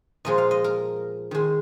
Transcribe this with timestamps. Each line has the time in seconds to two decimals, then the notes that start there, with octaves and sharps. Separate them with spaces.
0.25 A#2 F3 G#3 D#5
0.38 F5
0.51 D#5
0.64 A#4
1.31 D#3 G#3